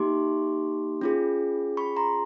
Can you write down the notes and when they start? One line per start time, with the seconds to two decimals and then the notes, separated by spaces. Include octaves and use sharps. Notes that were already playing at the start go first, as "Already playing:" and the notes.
Already playing: A#3 D#4 G4 C6 D6
1.01 C#4 F4 G#4
1.77 B5 C#6
1.96 A#5 C6